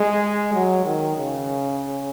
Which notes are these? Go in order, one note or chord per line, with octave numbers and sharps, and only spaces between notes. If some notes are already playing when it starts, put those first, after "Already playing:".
Already playing: G#3
F#3
D#3
C#3